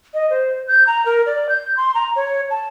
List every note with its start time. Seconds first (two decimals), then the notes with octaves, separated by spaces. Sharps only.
0.14 D#5
0.30 C5
0.68 G6
0.87 A#5
1.06 A#4
1.26 D5
1.49 G6
1.77 C6
1.95 A#5
2.16 C#5
2.50 A5